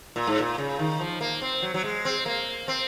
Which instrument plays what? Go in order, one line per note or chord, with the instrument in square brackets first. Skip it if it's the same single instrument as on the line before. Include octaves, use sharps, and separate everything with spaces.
[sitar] A#2
G#2
A#2
C#3
D#3
F3
A#3
C4
F#3
F#3
G#3
C4
A#3
C4